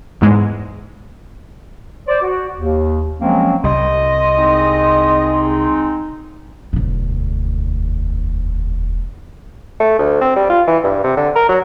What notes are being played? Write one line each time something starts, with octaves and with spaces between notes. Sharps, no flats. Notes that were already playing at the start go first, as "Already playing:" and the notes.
E2 G#2 G#3
C5 D5
F#4
D#2
F3 F#3 G#3 A#3 C4 C#4
C2 G3 D#5 C6
G#3 C4 D#4
E1 D2
A3
D2
C4
G3
F4
E3
G2
C3
D3
A#4
F#3